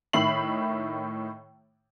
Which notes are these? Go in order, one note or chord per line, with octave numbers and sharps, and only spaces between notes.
A2 D#3 E5 B5 C7 F#7